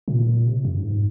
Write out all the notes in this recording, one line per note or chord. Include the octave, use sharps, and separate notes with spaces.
A#2
C3
F2
G2
G#2